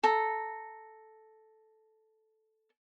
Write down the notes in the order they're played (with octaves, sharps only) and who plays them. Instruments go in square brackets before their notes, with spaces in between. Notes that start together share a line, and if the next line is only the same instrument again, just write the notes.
[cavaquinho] A4 A#5